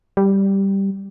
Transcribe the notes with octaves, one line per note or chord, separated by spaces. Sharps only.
G3